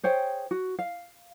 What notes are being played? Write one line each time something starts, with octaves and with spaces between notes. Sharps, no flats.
G#4 C5 C#5 G5
F#4
F5